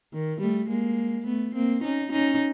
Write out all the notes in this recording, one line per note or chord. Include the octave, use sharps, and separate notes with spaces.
D#3
G3 A3
G#3 A#3
A3 B3
A#3 C4
C#4 D#4
C#4 D#4